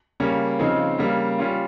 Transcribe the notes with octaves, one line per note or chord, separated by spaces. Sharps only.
C#3 G3 A#3 C#4
C#3 F3 C4 D#4
C#3 G3 A#3
G3 C#4 F4